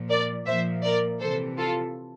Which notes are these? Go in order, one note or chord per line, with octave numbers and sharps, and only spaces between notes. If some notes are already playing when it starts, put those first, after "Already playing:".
Already playing: A#2 F3
A#4 D5
A#2 F3 C5 E5
A#4 D5
C3 E3 A4 C5
F4 A4